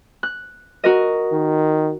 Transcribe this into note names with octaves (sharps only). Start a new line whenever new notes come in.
F#6
F#4 A#4 D#5
D#3